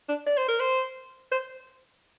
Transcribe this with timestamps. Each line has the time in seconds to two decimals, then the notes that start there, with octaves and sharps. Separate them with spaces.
0.09 D4
0.26 D5
0.37 C5
0.48 A#4
0.60 C5
1.32 C5